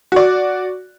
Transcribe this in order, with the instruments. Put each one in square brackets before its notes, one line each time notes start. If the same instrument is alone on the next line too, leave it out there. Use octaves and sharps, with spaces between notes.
[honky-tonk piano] F#4 D5